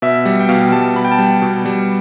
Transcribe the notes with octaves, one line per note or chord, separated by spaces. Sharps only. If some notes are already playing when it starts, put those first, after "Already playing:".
B2 E5
G3
G5
B2 F5
G3 A5
B2 B5
G5
A5
G3
B2
G3